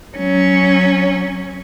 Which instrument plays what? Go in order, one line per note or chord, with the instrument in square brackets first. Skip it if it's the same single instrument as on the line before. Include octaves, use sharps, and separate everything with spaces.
[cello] F#3 C#4